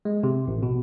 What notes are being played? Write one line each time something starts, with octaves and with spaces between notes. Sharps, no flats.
G#3
C3
A1
B2